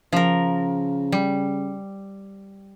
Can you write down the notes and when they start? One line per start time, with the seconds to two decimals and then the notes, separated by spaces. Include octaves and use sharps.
0.12 C#3 F3 A#4
1.12 G3